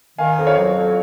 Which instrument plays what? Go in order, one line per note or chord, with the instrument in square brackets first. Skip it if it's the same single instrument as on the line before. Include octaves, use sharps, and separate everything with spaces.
[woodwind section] D#3 [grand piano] F5 G#5
[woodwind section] F2
[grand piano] C#5 F5
[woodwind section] F#3
F2